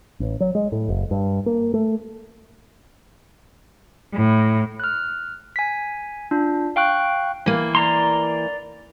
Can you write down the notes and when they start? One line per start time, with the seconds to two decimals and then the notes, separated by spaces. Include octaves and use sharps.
0.20 A1
0.40 F#3
0.55 G#3
0.72 A2
0.89 F#1
1.11 G2
1.46 A#3
1.74 A3
4.14 A2
4.80 F6 F#6
5.56 G#5 B6
6.31 D4 F4
6.76 F5 G5 C#6 F#6
7.46 E3 A#3
7.75 D5 A#5 C6